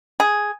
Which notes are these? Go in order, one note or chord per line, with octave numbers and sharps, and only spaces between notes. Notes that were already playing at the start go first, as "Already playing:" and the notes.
G#4